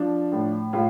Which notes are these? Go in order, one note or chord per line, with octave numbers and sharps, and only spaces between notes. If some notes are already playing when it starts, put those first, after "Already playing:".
Already playing: F3 D4
A2
A2 F4